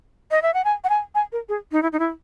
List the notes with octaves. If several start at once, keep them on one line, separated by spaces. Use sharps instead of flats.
D#5
E5
F#5
G#5
F#5
G#5
G#5
A#4
G#4
D#4
E4
D#4
E4